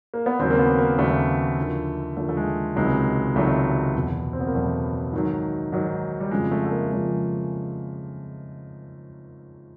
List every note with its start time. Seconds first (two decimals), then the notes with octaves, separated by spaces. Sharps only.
0.14 A#3
0.26 B3
0.39 D#2 C#3 F#3 C4
0.50 A#3
0.59 B3
0.79 A#3
0.98 D#2 C#3 F#3 A3
1.58 D#2 D3 F3
2.17 D#2 D3 F3 A3
2.29 A3
2.37 G#3
2.76 C#2 C3 D#3 F#3 G#3
3.35 C#2 C3 D#3 F#3 A3
3.95 E2 B2 F#3
4.33 C4
4.40 B3
4.47 A#3
4.54 E2 B2 F#3 A3
5.13 G#2 D#3 F#3
5.72 G#2 D#3 F#3
6.20 G3
6.31 F2 C#3 F3 G#3
6.51 A3
6.66 A3
6.71 A#3
6.91 F2 C#3 F3 G#3